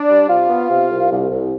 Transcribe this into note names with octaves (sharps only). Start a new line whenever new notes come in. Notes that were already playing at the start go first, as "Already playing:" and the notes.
Already playing: D4 D5
G3
C3 F4 F5
B3
C3
C2
C2
C2